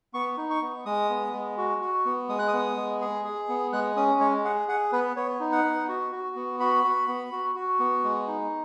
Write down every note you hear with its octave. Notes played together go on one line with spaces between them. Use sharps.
B3 C#6
D#4
C#6
B3
G#3 D#6
B3
G#3
F#4
F#4
B3
G#3 D#6
F#6
D#6
B3
G#3
G#4
G#4
B3
G#3 F#6
C#4 D#6
G#3 C#5
G#4 F#5
G#4 F#5
B3 B4
B3 C#5
D#4
F#5
B3
F#4
F#4
B3
F#4 B5
F#4
B3
F#4
F#4
B3
G#3
D#4